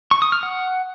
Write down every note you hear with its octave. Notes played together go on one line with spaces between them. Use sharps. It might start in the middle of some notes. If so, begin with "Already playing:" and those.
C#6
D#6
F6
F#5